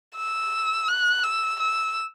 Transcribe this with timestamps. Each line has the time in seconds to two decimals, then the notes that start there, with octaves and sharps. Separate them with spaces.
0.16 E6
0.88 F#6
1.24 E6
1.60 E6